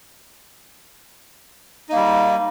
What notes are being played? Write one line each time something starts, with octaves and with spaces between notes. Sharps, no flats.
G3 A#3 D#4